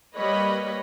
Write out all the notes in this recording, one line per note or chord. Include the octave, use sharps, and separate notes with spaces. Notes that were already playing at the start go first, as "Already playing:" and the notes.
G3 A#3 B4 C#5 D#5 B5